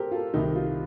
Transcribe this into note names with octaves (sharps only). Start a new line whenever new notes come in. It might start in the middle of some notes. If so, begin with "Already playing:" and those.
Already playing: G4 A4 A#4 C5
F4 A4
C2 C3 D#3 D#4 G4
F4